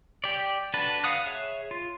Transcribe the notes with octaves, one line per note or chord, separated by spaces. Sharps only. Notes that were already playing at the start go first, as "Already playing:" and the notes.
G4 D5
D4 F#4 A4 B4 A5
F5 F#5 D#6 F#6
G#4 C#5 E5
F4